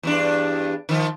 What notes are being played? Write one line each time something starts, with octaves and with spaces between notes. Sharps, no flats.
E2 G2 D4
D#3 F3